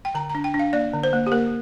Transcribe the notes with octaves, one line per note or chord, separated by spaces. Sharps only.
G5
D3 A#5
A#5
D4
G5
D4
F5
A#3 D5
D3
C5
A#3
G4
A#3 A#4